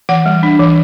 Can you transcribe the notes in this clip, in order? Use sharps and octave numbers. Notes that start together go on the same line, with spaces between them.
E3 F#5
G3
D4
E3